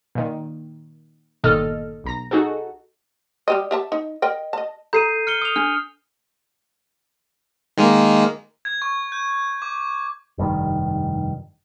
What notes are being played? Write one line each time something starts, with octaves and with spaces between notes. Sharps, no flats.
A#2 D#3
G1 A#2 D#3 A4 D#5 F6
B1 A#5 A#6
D#4 F#4 G#4 A4
G3 G4 D#5
G4 E5 A5
D#4
A#4 D#5 G5
D#5 A5
A4 A#5 G6 C7 D#7
F6 C#7 G7
D#6 F7
D4 F6
D#3 G#3 A#3
G#6
C#6
G6
D6
F1 G2 A#2 D#3